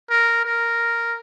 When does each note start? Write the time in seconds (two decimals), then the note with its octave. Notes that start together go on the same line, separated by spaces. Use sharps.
0.10 A#4
0.45 A#4